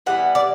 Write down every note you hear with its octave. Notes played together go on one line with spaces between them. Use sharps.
E3 G3 B3 F#5
D5